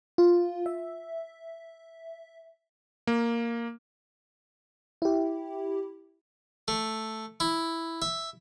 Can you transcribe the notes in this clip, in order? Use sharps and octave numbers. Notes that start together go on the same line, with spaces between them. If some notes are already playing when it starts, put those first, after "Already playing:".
F4
E5
A#3
E4 G4
A3
E4
E5